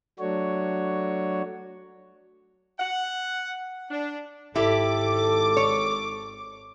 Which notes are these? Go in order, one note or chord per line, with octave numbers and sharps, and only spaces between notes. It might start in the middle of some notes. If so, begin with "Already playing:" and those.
F#3 A3 D4 F#4 C#5
F#5
D4
G#1 E4 G4 A4 D6
C#5